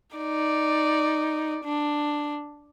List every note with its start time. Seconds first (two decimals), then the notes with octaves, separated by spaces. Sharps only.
0.16 D#4 D5
1.64 D4